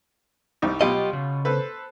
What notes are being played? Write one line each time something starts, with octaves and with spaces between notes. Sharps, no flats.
C2 G3 D#4
B2 F#3 F4 G4 D#5
C#3
A4 B4 C5